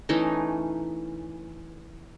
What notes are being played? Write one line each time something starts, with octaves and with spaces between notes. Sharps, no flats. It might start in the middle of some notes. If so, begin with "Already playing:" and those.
E3 A3 C#4 D#4